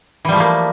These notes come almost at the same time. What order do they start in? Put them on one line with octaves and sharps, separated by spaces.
E3 G3 F3 A3 A#3